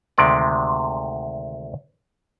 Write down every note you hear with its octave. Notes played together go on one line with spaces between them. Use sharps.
D2 C3 D#3 G#3 D5